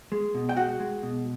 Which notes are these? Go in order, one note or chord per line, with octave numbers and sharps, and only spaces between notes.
G#3
B2
G5
G#3 F#4 F#5
G#3
B2